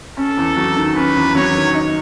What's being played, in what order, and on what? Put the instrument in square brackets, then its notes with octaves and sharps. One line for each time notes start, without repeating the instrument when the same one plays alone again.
[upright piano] C#4 [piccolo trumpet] A4
[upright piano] E2
F#3
D#3
[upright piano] C#4 [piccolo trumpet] B4
[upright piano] E2
[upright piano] F#3 [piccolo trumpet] C#5
[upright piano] D#3
D#4